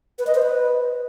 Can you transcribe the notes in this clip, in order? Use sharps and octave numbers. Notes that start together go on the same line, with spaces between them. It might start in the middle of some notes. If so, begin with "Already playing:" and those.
B4
D#5
C5
B4